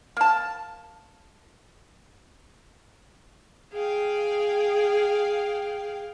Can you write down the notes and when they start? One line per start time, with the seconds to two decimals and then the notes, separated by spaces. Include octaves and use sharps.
0.17 A#3 A5
3.73 G#4 F5 G5